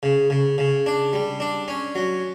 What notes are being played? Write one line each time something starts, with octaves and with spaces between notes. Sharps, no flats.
C#3
C#3
C#3
D4
G3
D4
C#4
F#3